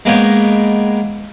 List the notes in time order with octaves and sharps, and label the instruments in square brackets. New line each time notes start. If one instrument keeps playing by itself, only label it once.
[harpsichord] G#3 A#3 B3 C#5 G5